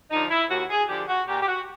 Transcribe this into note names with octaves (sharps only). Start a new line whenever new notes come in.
D3 F3 D#4
E4
D#2 F#4
G#4
D3 F3 G4
F#4
A#2 G4
G4
F#4